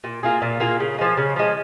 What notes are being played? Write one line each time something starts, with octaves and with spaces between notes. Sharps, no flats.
A#2
A#3 F4 G#4
A#2
A#3 F4 G#4
C#3
F3 G#3
C#3
F3 G#3